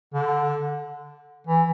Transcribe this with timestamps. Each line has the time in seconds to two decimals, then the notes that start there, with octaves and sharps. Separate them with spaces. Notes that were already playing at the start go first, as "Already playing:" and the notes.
0.14 D3
1.47 E3